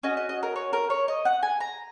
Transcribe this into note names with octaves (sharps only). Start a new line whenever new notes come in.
C#4 F#4 D#5
D#5
D#5
A#4
C#5
A#4
C#5
D#5
F#5
G#5
A#5